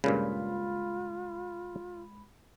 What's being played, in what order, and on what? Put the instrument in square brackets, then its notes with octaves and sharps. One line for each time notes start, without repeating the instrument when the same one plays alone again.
[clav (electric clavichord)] G2 A#2 C#3 [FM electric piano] G#3 B5 [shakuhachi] F4